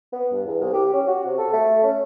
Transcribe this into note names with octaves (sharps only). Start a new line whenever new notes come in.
B3
G2
E2
C2
G4
C#4
F#4
C3
A4
A3
C#4